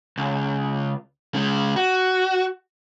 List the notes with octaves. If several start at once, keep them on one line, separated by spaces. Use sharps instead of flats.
C#2
C#3 G#3
F#4